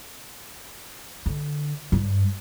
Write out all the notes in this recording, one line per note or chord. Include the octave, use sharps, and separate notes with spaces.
D3
G2